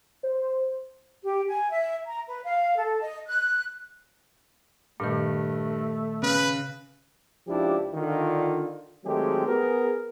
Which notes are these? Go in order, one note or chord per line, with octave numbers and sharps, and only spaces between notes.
C5
G4
G#5
E5
A#5
B4
F5
A4
D#5
F#6
G2 A#2 D#3 A3
C#3 B4
C#2 F3 D4 E4 G4
D3 D#3 D4 F4
D#3 F#3 G#3 A3 C4 G4
B3 G#4 A#4